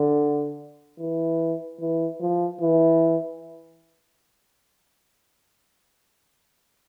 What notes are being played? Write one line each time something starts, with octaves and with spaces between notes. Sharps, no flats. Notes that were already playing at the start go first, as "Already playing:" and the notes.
Already playing: D3
E3
E3
F3
E3